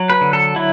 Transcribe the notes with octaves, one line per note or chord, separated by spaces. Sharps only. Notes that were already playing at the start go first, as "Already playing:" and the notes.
Already playing: F#3
B4
D3
A4
F#3 E4